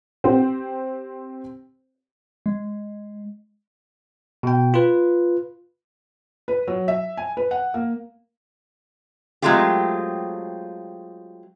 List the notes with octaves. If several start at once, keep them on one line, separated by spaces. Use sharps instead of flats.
C4 G4 C5
G#3
B2 G5
F4 B4
B4
F#3
E5
G#5
B4
F#5
A#3
F#3 G#3 A3 C4 F4 G4